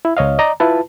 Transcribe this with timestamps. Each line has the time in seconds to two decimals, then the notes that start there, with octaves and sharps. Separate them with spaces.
0.05 E4
0.17 C#2 C#5 D#5 F5
0.39 D5 D#5 A#5
0.60 E4 F4 B4 A5